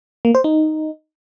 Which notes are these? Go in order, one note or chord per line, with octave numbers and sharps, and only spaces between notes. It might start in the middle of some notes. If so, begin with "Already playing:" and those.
A#3
C5
D#4